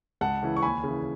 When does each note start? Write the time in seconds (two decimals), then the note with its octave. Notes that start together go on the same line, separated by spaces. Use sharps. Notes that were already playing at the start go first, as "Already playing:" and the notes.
0.21 C#2 F#5 A5
0.43 C#3 E3
0.57 C#6
0.62 D#2 G#5 B5
0.83 C#3 E3